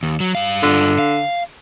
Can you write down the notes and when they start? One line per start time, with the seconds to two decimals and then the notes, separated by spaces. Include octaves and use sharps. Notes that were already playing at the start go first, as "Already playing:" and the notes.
0.03 D#2
0.20 F#3
0.35 G2 F5
0.63 G2 D3 F4
0.99 F5